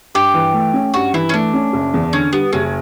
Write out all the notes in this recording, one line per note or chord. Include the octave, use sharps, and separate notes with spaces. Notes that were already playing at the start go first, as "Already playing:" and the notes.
G2 G4
E3
A3
C#4
G2 F#4
E3 E4
C#4
A3 D4
C#4
F#1
E2
D3 C#4
G3 B3
F#1 C#4